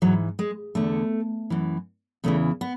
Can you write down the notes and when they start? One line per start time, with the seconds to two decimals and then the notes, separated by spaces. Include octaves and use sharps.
0.02 G#2 E3 F#3
0.39 G#3
0.75 E2 D3 A3
1.50 F#2 E3
2.24 E2 C#3 E3 A3
2.61 B3